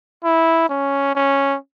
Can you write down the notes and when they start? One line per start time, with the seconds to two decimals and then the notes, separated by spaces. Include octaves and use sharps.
0.24 E4
0.69 C#4
1.15 C#4